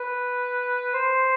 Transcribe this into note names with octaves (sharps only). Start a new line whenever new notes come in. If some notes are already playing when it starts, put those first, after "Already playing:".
Already playing: B4
C5